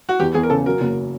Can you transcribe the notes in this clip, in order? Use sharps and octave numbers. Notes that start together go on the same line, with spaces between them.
F#4
E2 G4
E2 G#4
A#4
C#3 A4
F#3 A#4
F#1